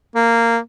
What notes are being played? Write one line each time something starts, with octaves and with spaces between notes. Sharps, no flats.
A#3